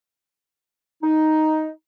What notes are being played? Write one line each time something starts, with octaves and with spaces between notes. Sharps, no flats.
D#4